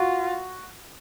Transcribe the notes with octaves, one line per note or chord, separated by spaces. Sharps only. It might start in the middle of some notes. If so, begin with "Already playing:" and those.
Already playing: F4 F#4